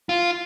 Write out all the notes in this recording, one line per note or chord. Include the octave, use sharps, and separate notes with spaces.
F4